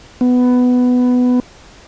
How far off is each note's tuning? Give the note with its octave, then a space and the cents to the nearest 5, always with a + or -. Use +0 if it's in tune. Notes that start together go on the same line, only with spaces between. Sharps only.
B3 +10